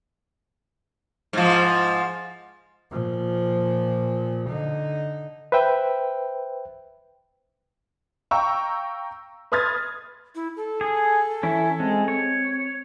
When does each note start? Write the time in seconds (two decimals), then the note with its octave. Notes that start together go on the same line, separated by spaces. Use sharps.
1.33 G#2 F3
2.91 A#2 F3
4.49 D3 D#4
5.52 B4 C5 E5 G5
8.31 F5 G5 A#5 C#6 E6
9.52 B4 C6 D#6 F6 G#6 A6
10.35 E4
10.56 A4
10.81 G#4
11.43 E3 C#4 E4
11.80 G#3 C4
12.08 C#5